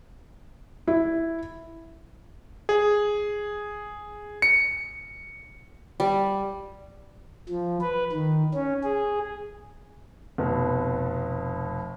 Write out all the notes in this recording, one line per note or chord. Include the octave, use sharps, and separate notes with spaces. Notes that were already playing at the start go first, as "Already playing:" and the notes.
E4
G#4
C#7
G3
F3
B4
D#3
C#4
G#4
F1 B2